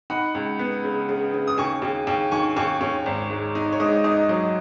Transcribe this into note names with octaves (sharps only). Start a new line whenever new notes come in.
D#4 F#5 B5
C#2
B3
C#3
C#3
C#3
D#6
D#2 G#5 C#6
D#2
D#2
D#3 G#5 C#6
D#2 G#5 C#6
D#2 C#5
G#1
G#2
D#4
C#5
G#2 D#5
D#4 D#5
F#3 D#5